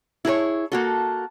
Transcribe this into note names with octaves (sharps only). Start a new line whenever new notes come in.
E4 G#4 A#4 C#5
A#3 F#4 A4